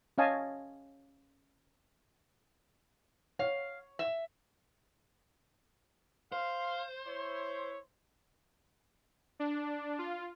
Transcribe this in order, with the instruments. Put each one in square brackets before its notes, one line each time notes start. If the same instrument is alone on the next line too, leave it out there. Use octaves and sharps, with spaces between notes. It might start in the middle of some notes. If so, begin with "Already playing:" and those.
[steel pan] C#4 C#5 D#5 F5 G#5 A5
[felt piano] C#5 [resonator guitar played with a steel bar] F5
[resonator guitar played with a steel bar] E5
[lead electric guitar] C5 [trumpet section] F5
[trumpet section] E4 C#5
[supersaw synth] D4
F4